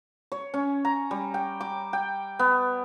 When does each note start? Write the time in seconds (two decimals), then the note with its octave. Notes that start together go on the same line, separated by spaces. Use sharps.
0.32 C#5
0.54 C#4
0.85 A#5
1.11 G3
1.34 G5
1.61 D6
1.93 G5
2.39 B3